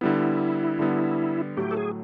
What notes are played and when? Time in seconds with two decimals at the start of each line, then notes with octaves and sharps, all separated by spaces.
0.01 D3 G3 B3 E4
0.79 D3 G3 B3
1.57 A2 F#3 A3 G4
1.71 A4
1.77 G#4